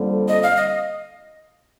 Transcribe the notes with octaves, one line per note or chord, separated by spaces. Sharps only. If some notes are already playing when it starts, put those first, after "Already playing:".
Already playing: F2 D3 G3 A#3
D#5
F5
D#5